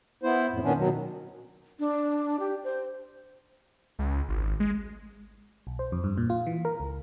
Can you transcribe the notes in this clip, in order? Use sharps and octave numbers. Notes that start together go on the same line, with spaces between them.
B3 E4 C5
F2 A2
A#2 D#3 B3 C#4 D4
B2 D#3 F#3
D4
G4
C5
C#2
G#1
G#3
B1
C5
F2
G2
A#2
F4
E3
A#4
C#2